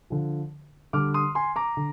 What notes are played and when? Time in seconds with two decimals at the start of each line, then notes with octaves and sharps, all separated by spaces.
0.10 D3 F3
0.93 D3 G3 D6 F6
1.14 C6 D#6
1.35 G#5 C6
1.56 A#5 D6
1.77 D3